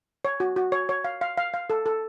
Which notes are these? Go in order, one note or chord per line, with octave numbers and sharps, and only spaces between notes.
C#5
F#4
F#4
C#5
C#5
F5
F5
F5
F5
A4
A4